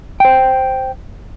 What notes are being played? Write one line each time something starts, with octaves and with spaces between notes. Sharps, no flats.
C5 G5